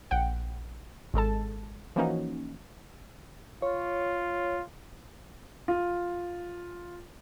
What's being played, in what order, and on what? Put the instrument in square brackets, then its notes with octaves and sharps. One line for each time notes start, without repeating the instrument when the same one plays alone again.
[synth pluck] A#1 F#5 G5
G#1 G#3 A4 A5
E3 F3 A#3 C#4 D#4 F#4
[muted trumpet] F4 [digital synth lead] C#5
[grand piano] F4